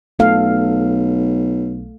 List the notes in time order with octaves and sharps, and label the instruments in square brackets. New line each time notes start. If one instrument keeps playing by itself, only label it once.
[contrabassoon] B1 [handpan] A3 A4 F5